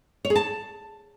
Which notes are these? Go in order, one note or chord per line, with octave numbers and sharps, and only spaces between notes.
C#5
G#4
A5